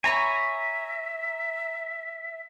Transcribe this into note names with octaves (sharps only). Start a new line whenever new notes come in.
C#5 E5 G#5 A#5 B5 C#6